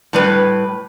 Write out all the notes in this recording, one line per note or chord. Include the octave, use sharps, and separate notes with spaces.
A2 G3 B4